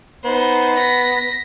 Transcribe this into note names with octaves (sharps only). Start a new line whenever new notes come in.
B3 D#4 C5
A#6 B6